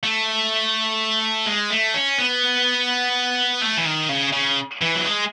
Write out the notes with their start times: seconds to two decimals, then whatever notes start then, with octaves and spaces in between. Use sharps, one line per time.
0.03 A3
1.46 G#3
1.70 A3
1.94 C#4
2.18 B3
3.61 A3
3.77 E3
3.85 D#3
4.09 C#3
4.33 C#3
4.81 E3
4.95 F#3
5.05 G#3